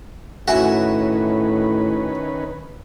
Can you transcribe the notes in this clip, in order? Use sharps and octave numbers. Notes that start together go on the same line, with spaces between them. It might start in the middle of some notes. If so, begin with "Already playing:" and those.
A2 D#3 C#4 F#4 B4 E5 G#5